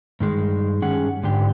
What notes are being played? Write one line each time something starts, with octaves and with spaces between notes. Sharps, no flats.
G2 D#3 G#3
G2 C#4 G#4 F#5
G#2 D3 G4